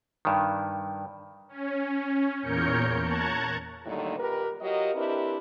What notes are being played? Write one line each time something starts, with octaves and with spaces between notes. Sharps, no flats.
G2 D#3
C#4
E2 A#2 A#4 C#5 G6 C#7
A5 A#5 C#6 F#6 G#6
A2 D3 D#3 F#3 G3 A#3
A#2 G4 A#4 B4
F#3 F4 G4 A#4 D#5
C4 D4 E4 G4 A#4 B4